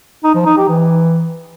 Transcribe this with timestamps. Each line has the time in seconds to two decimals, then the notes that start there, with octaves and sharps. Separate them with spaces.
0.24 D#4
0.35 F3
0.46 D#4
0.57 G4
0.68 E3